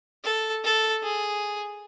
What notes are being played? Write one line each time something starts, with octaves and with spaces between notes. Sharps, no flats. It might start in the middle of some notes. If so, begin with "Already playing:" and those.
A4
A4
G#4